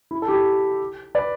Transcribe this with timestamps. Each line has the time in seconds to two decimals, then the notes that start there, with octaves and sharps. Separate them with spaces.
0.11 E4
0.22 A4
0.28 E4 G4
1.15 B4 D5